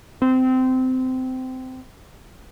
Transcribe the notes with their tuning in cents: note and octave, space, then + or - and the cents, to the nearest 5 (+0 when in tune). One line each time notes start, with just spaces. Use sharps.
C4 -20